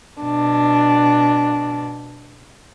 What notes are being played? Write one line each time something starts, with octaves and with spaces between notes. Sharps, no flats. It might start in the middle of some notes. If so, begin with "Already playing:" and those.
B2 D4